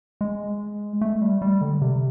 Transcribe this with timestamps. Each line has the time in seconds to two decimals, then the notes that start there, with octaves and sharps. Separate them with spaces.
0.21 G#3
1.01 A3
1.21 G3
1.42 G3
1.61 D3
1.82 C3